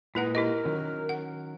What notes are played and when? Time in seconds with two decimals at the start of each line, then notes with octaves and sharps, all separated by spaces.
0.15 A#2 G#3 D#4 E4 B4 F#5
0.35 E4 G4 A#4 D#5
0.65 D#3 F#3 C#4
1.09 F#5